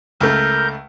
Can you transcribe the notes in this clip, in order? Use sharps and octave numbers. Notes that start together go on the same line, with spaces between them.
C#2 A3 A#4 G6